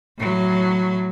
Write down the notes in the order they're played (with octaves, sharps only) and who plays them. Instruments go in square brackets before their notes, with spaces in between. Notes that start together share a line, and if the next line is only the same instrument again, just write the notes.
[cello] A2 F#3